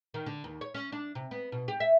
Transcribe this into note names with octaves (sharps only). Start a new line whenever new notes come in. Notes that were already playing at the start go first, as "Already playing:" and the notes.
D#3
D3
D#2
C#5
C#4
D4
C3
B3
B2
G4
E5